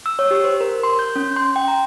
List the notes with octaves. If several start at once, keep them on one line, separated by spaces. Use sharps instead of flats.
E6
C#5
G4
C5
A#4
C6
G6
C#4
C6
G5
A#5